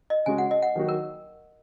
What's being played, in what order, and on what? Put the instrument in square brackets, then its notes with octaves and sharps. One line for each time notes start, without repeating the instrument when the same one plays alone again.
[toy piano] D#5
[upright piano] C#3 G#3 C#4 F#4 [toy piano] G#5
[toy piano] F#5
D#5
F#5
[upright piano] D#3 F#3 A#3 D#4 F#4
[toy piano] A#4